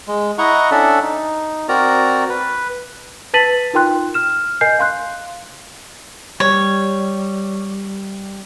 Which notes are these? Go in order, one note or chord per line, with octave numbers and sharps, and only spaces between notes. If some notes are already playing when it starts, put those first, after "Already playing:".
G#3
E4 D#5 F#5 A#5 C#6
C#4 D4 A4 D5 E5 F#5
D#4
C4 F#4 A#4 D5 A#5
B4
B4 A5 A6 B6 D#7 F#7
D#4 F4 A#4 G5 C6 F#6
F6 E7
A#4 D#5 G#5 G6 C7
F5 C6 F#6
G3 C#5